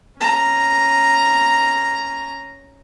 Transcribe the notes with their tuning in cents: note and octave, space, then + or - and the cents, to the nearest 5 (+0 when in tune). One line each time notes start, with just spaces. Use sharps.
C#4 +0 A#5 +0